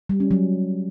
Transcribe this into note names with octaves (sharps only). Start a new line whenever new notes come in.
G3
C#4
F#3